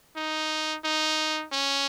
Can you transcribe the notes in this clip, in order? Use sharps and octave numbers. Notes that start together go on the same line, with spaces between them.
D#4
D#4
C#4